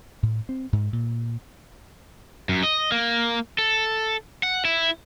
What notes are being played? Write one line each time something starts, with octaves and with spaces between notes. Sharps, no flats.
A2
C4
G#2
A#2
F#2
D#5
A#3
A4
F#5
E4